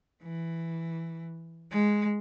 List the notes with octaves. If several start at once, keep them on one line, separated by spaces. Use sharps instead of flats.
E3
G#3